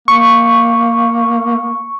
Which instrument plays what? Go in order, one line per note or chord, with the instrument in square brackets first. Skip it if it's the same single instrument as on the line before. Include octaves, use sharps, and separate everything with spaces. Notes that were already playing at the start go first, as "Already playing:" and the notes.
[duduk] A#3 [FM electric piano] C#6